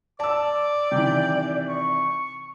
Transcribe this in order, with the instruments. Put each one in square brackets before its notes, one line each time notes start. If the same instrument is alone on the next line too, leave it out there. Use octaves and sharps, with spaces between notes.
[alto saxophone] D5 [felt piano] A5 E6 [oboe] D6
[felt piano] C3 D#3 E3 [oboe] G5
[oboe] C#6